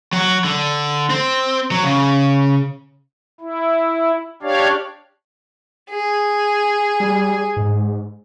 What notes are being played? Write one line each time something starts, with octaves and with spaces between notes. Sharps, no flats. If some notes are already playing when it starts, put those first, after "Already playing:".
F#3 F#5
D3
C4
F#3
C#3
E4
D4 G4 C#5 D5 F5
G#4
G3
G#2